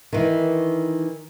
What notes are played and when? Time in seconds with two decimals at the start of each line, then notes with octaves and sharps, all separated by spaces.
0.13 D#3 E3